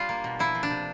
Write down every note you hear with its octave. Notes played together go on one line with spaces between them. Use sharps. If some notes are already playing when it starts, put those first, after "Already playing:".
Already playing: G3 D4 F4
A#3
B2
F3 E4
F3
D4
C3